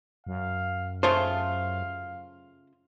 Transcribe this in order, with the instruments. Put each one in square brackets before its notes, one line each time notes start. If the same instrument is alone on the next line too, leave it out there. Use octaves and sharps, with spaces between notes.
[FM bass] F#2 [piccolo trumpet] F5
[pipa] C#3 A3 F4 [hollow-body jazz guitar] C5 [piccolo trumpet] F5